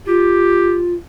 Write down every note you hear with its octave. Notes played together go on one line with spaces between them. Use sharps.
F4 G4